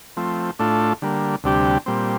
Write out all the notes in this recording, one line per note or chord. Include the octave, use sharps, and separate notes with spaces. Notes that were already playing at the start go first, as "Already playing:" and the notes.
F3 A3 C4
A2 A3 D4 F4 A4
D3 G3 A#3
D2 C3 G3 D4 G4
A#2 G3 C4